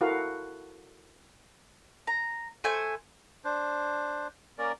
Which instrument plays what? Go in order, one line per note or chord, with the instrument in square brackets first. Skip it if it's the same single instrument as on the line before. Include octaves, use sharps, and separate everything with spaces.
[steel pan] E4 F#4 A4 A#4 F5
[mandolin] A#5
A3 C5 G#5
[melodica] D4 C5
A#3 C#4 A#4 D5